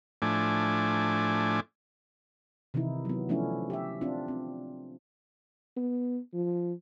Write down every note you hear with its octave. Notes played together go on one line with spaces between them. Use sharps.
A2 F3 A3 D4 G#5 D6
C3 D#3 E3 D#4 E4
F#3 B3
F3 A3 C#4 D4 E4
G4 E5
C4 D4 F4
C4
B3
F3